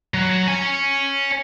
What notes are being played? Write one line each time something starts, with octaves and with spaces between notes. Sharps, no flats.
F#3
C#5 G#5